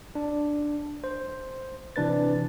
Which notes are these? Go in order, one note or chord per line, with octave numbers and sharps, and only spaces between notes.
D4
C5
C3 E3 D4 B4 A6